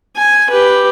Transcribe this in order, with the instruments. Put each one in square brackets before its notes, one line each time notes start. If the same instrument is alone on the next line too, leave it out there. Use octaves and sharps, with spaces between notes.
[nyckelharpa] G#5
G4 B4